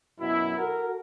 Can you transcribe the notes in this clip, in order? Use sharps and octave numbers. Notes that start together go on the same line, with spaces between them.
F#2 B2 E4
F#4 A4 A#4